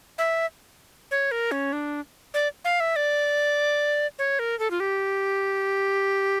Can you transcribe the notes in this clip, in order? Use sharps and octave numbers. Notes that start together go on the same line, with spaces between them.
E5
C#5
A#4
C#4
D4
D5
F5
E5
D5
C#5
A#4
A4
F4
G4